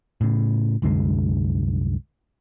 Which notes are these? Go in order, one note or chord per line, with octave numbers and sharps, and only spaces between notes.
A2 C#3
C2 F#2 D3 G#3